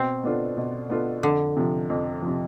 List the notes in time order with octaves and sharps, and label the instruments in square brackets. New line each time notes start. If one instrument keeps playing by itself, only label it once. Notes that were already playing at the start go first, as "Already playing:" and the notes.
Already playing: [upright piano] B2 [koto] C4
[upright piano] B3 D4 F4 A4
B2
B3 D4 F4 A4
[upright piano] F2 [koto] D3
[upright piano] C3 F3
F2
F3
C3